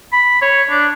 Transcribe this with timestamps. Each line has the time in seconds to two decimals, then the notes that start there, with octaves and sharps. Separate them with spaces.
0.13 B5
0.42 C#5
0.70 D4